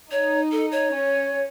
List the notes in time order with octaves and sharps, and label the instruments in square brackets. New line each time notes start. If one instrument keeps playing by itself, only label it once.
[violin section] D#4 [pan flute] C#5
[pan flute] A4
C#5
[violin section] C#4